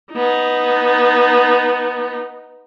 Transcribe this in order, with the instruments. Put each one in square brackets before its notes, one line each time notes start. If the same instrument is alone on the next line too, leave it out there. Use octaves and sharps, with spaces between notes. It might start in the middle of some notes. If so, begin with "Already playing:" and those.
[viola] B3 D#4